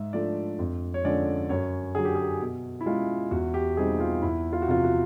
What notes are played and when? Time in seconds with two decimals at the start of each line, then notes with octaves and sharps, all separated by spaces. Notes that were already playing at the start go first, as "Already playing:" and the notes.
Already playing: G#2 E5
0.13 F3 A3 D4 D5
0.59 F2
0.94 C#5
1.04 D3 F3 G#3 C#4 D5
1.49 F#2 C#5
1.95 D3 F#3 G#4
2.05 G4
2.15 G#4
2.41 B2
2.81 E4
2.86 G#3 C#4 F4
3.31 E2 F#4
3.54 G4
3.77 B2 G3 C4 D#4 G#4
4.00 F4
4.22 E2 E4
4.53 F4
4.62 F#4
4.68 C3 F3 F4
4.84 F#4